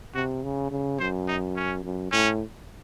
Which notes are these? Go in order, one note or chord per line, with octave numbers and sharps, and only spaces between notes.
C3 F#4
C#3
C#3
F#2 C5
D#4
C#4
F#2
A2 C#4